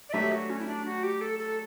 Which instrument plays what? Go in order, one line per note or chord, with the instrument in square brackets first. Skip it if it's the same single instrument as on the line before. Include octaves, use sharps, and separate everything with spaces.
[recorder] D5
[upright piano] F#3 A3 D4 G4 [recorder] E5
[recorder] F#4
C#4
E4
D4
F#4
G4
A4
A4